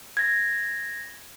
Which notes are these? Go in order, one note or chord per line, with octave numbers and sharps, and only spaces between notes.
G#6 A#6